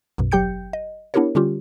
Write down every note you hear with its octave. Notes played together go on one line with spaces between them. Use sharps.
B1 F#2 B2
G1 F#3 G4 G5 G6 C#7
D#5
B3 D4 E4 G4 A#4 C#5
D3 G3 C#4 F4 G4